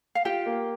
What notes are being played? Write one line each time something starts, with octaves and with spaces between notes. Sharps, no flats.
F5
F4 G4 G5
A#3